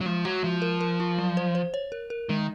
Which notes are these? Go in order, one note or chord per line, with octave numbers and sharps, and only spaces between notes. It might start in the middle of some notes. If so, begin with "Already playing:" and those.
F#3
F3 G#3
F#3 F#4
F3 G#3
A#4
A#4
F4
F#3
C5
C5
C#5
A#4
A#4
D#3 G#3